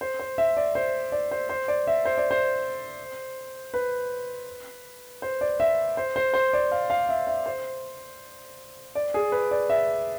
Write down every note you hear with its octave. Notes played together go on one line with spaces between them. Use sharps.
C5
C5
E5
D5
C5
D5
C5
C5
D5
E5
C5
D5
C5
B4
C5
D5
E5
C5
C5
C5
D5
F5
F5
E5
E5
C5
D5
G#4
B4
D5
E5